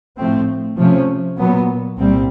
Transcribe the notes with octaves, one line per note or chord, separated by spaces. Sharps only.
A2 F3 A3 C4
C3 F3 A3 C#4
A#2 F#3 B3
C2 A#2 G3 C4